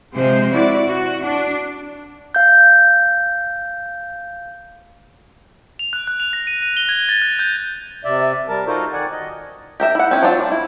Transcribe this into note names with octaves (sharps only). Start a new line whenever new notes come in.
C3 F3 G#3 C5
E4 F#4 D5
F#4
D4
F5 G6
F7
F#6
F#6
F7
A#6
D#7
D#7
G7
G#6
A6
F#6
G6
C3 D5 E5
G3 A#4 A5
D#4 F4 F#4 A4 A#4 C5
D#3 D5 F#5 G#5
D#5
G4 A#4 E5
E4 F#5
C4 C#4 E4
F#3 C4 D4 F4 D5
G3 D4
E4